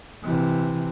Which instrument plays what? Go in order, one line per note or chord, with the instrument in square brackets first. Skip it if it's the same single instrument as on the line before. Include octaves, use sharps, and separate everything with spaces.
[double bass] C3 E3